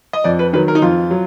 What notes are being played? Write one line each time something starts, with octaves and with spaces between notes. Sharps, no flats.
D#5
F2 D5
B4
D#3 F#3 B4
A#4
D#4
F2 F4
F#3